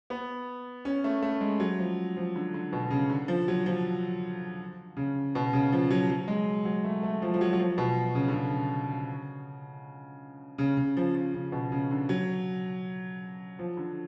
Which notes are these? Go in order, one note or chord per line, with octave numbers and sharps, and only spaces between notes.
B3
C#4
A3
A3
G#3
F#3
F3
F3
D3
D3
B2
C#3
D3
F3
F#3
F3
C#3
B2
C#3
F3
F#3
F#3
G#3
F#3
A3
A3
F3
F3
F#3
F#3
F3
B2
C#3
D3
C#3
C#3
C#3
F3
F3
C#3
B2
C#3
D3
F#3
F3
D3